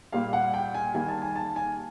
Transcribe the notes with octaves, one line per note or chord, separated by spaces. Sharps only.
A#2 G3 A#3 F5
F#5
G5
G#5
D#3 G3 A#3 G#5
A5
G#5
A5
G#5